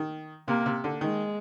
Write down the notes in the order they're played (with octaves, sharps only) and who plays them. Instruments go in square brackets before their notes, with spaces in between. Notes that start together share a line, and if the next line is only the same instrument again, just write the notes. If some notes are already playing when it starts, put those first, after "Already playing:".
Already playing: [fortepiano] D#3
[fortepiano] C3 [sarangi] A#3
[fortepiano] C3
D3
[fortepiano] D#3 [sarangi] G#3